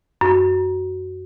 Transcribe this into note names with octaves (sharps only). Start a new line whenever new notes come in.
F#2